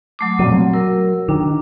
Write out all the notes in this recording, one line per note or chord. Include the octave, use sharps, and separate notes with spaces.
F#3 A3 D6
A#2 D3 F#3 C4
F#3
A#4 E6
D#3 D4